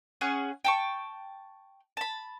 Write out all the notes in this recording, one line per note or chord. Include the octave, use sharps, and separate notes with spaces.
C#4 G#4 F#5
G5 A5 C#6
A5 B5